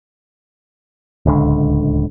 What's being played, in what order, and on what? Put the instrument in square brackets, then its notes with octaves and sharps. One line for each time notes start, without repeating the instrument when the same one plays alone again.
[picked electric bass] D1 C#2 D3